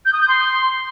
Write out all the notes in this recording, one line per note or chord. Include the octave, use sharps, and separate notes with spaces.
G6
D#6
G6
C6